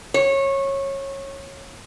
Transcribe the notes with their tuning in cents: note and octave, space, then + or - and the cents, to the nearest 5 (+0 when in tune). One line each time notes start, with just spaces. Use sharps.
C#5 -20